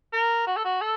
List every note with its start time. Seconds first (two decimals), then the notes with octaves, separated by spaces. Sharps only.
0.13 A#4
0.47 F#4
0.56 A4
0.65 F#4
0.81 A4